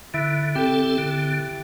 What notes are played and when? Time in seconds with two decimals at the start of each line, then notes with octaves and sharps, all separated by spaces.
0.14 D3 E4 E5
0.55 C4 G4 A4 G5
0.98 D3